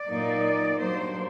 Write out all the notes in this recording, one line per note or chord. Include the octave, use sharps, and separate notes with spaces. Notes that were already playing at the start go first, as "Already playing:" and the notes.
Already playing: D5
A#2 F#3 A#3 D#4
G2 F#3 A#3 C5